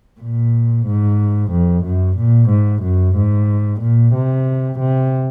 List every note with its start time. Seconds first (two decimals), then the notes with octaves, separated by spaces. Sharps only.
0.20 A#2
0.86 G#2
1.51 F2
1.84 F#2
2.17 A#2
2.49 G#2
2.83 F#2
3.16 G#2
3.81 A#2
4.14 C3
4.79 C3